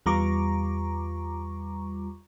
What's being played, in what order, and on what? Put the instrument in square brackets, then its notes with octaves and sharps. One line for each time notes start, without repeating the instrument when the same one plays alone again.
[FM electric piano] E2 G3 F4 A#5 C#6 D6